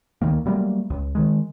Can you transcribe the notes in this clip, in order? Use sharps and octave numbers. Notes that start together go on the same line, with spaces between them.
D2 D#3 A#3
F#3 G3 A3 A#3
C#2
D#3 G#3